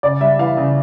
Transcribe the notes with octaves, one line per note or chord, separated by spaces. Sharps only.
C#3 D5
G3 E5
E3 F5
C#3